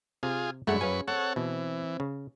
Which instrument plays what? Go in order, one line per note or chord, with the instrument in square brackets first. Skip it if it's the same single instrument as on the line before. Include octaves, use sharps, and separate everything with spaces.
[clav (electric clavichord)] C3 [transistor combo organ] F4 G#4
[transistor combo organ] F#2 B5 C#6 [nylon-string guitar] G#3 D4 [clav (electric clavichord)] A3 F#5
[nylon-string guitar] C#4 B4 [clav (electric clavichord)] F5 G#5
[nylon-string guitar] C4 [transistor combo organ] A4 C#5 F#5
[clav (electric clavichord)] B2 [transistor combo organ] E3
[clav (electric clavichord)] C#3